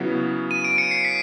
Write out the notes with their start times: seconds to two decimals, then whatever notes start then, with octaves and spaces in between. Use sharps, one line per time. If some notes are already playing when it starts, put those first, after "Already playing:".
Already playing: C#3 F#3 B3 E4
0.51 D#7
0.64 D7
0.78 C#7
0.91 C7
1.05 B6